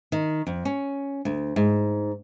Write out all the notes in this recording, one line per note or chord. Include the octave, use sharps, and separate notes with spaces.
D#3
F2
C#4
D2
G#2